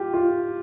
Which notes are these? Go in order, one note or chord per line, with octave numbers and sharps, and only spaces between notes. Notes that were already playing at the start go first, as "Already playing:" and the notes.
Already playing: F4 G4
F4